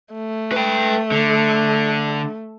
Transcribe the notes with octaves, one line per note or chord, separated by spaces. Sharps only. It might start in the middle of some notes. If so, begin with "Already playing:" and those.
A3
B4 G5
D3